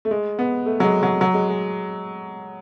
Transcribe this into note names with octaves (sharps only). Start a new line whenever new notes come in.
A3
G#3
B3
A3
F#3
G#3
F#3
F#3
G#3
G#3